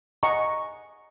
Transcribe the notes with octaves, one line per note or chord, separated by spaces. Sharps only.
D#5 F#5 G#5 A#5 C#6